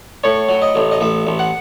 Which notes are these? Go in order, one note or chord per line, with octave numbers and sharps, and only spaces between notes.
A2 C#5
F#3
D#5
A1
D#5
A1 E5
A1
F#5